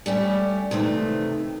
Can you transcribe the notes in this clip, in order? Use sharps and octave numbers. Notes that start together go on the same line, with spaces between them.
G3 A3 C#4 G4
C3 D#3 E3 A3